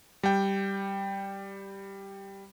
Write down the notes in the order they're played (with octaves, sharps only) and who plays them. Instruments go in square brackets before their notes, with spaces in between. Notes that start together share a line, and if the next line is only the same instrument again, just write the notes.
[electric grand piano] G3 G5